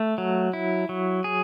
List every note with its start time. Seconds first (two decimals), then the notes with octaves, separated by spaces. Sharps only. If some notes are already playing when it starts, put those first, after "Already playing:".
Already playing: A3
0.18 F#3
0.53 E4
0.89 F#3
1.24 G#4